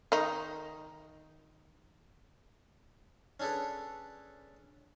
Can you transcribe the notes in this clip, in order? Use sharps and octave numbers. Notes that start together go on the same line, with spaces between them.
D#3 D#4
C#4 D4 G#4 A4 B4